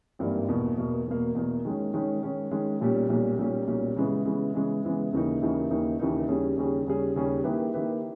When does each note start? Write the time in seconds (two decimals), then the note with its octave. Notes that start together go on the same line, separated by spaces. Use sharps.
0.19 G#1 G2 E3 A#3
0.48 E2 B2 A#3
0.77 E2 B2 A#3
1.06 E2 B2 A#3
1.35 E2 B2 A#3
1.65 D#3 G#3 C#4
1.94 D#3 G#3 C#4
2.23 D#3 G#3 C#4
2.51 D#3 G#3 C#4
2.81 B1 A#2 G3 C#4
3.09 B1 A#2 G3 C#4
3.39 B1 A#2 G3 C#4
3.67 B1 A#2 G3 C#4
3.96 C#3 E3 G#3 B3
4.25 C#3 E3 G#3 B3
4.54 C#3 E3 G#3 B3
4.84 C#3 E3 G#3 B3
5.13 D#2 C#3 E3 A#3 D#4
5.41 D#2 C#3 E3 A#3 D#4
5.70 D#2 C#3 E3 A#3 D#4
5.99 D#2 C#3 E3 A#3 D#4
6.29 D#2 C#3 G3 C#4 G#4
6.57 D#2 C#3 G3 C#4 G#4
6.87 D#2 C#3 G3 C#4 G#4
7.16 D#2 C#3 G3 C#4 G#4
7.44 D#3 A#3 E4 G4 B4
7.74 D#3 A#3 E4 G4 B4